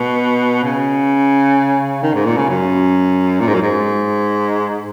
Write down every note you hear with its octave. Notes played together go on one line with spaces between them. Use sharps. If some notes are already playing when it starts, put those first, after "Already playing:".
Already playing: B2
C#3
D#3
G#2
A#2
C#3
F#2
A#2
G#2
F#2
G#2